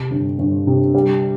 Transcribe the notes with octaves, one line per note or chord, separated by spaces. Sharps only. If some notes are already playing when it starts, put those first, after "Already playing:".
Already playing: C3
G1
G1
C3
G3